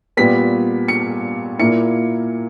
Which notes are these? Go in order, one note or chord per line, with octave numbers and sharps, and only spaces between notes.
A#2 G3 B3 B6
C#7
A#2 A#3 E4 C#7